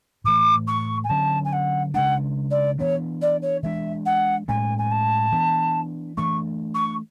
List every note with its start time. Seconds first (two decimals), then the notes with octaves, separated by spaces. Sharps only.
0.24 A2 E3 A3 D6
0.67 C#6
1.03 G#5
1.09 D3 F#3 C#4 A5
1.44 G#5
1.52 F#5
1.94 C#3 G#3 D4 F#5
2.50 D5
2.79 E3 B3 D4 C#5
3.21 D5
3.41 C#5
3.63 E3 G#3 D4 E5
4.05 F#5
4.48 A2 G#3 C#4 G#5
4.78 G#5
4.91 A5
5.32 E3 B3 D4
6.17 E3 A3 D4 C#6
6.74 C#6